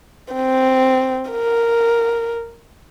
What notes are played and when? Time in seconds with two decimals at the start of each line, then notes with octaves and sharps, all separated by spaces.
0.34 C4
1.31 A#4